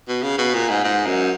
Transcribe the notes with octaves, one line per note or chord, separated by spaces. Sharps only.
B2
C#3
B2
A#2
G#2
G#2
F#2